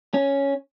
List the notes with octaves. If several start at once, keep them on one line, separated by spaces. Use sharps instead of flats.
C#4